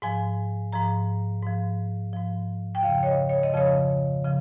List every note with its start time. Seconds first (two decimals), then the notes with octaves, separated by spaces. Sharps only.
0.02 G#2 F3 G#5
0.72 G#2 F3 A#5
1.42 G#2 F3
2.13 G#2 F3
2.75 G5
2.83 F2 C#3 F3 F5
3.03 C#5
3.06 D#5
3.29 C#5
3.43 D#5
3.54 F2 C#3 F3 C#5
4.25 C#3 F3